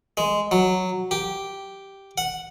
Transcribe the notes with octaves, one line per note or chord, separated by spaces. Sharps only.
G#3
F#3
G4
F#5